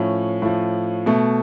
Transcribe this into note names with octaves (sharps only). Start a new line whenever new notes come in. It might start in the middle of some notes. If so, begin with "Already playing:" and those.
Already playing: A2 F3 C#4
A2 F3
B2 A3